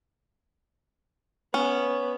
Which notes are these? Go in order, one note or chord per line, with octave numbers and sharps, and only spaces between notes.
B3 C#4